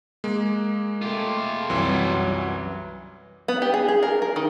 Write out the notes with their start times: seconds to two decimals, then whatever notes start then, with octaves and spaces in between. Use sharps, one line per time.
0.24 G#3 A#3
1.02 A3 F4 G4
1.70 C2 F#2 E3 F#3 G3
3.48 B3
3.62 G4
3.74 G#4
3.89 G#4
4.03 A#4
4.22 A#4
4.36 D#3